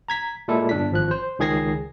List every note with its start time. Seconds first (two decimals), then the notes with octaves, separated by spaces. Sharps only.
0.08 A#5 G#6 B6
0.48 A#2 G#3 E4 A4
0.69 G1 D4 B6
0.91 G#1 F3 F#6
1.11 C5
1.39 C#2 D#3 G#4 G#6 A#6 C7